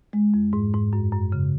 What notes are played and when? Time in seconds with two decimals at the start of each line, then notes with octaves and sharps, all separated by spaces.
0.13 G#3
0.34 F2
0.53 G#2
0.74 G#2
0.93 F#2
1.12 F#2
1.32 C#3